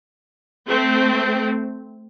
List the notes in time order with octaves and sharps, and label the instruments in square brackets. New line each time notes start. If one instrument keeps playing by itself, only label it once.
[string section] A3 C4